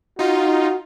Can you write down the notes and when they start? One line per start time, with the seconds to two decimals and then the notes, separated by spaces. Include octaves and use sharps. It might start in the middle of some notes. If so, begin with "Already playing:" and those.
0.19 D#4 F4 F#4